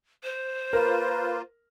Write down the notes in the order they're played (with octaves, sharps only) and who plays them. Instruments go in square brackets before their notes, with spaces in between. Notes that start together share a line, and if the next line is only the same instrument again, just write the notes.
[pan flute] C5
[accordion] A#3 F4 [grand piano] A#4 [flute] B4